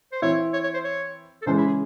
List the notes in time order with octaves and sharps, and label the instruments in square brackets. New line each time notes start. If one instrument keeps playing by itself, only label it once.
[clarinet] C5
[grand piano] E3 C4 E4 [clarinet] C#5
[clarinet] C#5
C#5
C5
C#5
A4
[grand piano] C#3 E3 G#3 C#4 [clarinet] C5
[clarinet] E4
G#4